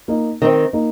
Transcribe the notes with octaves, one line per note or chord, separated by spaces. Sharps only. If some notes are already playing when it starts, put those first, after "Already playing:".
A#3 D#4
D#3 C4 D#4
A#3 D#4